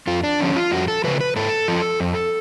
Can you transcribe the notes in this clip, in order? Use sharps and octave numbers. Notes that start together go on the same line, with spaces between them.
F2 F4
D4
D3 F3 C#4
F4
F2 F#4
A4
C#3 F3 B4
B4
G#2 A4
F3
F2